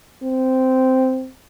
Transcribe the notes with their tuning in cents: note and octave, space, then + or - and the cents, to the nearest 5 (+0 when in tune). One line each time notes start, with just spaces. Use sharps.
C4 -10